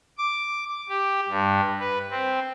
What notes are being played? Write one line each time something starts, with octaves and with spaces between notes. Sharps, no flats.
D6
G4
G2
B4
C4